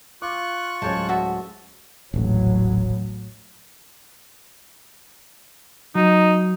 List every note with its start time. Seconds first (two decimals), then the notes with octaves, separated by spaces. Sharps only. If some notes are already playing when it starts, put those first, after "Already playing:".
0.22 F4 C#6 D6 F#6
0.82 D1 G#3 C#4 C#5 G5 A5
1.09 F#4 E5 A5
2.14 D#1 A1 A2 F#3
5.95 F#3 D#4